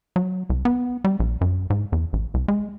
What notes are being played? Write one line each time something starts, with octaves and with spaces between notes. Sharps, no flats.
F#3
C2
B3
G3
A#1
F#2
G#2
E2
A1
C2
G#3